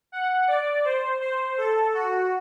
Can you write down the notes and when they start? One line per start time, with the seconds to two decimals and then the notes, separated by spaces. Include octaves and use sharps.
0.12 F#5
0.48 D5
0.84 C5
1.21 C5
1.58 A4
1.94 F#4